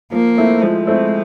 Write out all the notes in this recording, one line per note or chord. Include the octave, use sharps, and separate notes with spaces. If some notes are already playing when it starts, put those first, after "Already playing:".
F3 A#3
A3 C4 E4
F3 G#3
A3 C4 E4